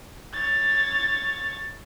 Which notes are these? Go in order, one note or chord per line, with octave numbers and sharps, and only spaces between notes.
C#5 A6